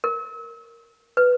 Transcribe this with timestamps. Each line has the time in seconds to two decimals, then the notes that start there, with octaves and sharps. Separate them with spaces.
0.04 A#4
1.17 B4